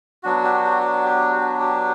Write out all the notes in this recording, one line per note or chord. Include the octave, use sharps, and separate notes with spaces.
F#3 B3 D4 F#4
G4
F#4
G4
F#4
G4